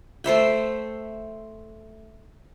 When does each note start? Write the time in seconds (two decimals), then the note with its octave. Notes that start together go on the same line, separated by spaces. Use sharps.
0.24 A3 C5 E5 G5